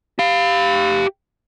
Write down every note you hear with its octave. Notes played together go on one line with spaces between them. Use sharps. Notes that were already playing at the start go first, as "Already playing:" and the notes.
G4 F5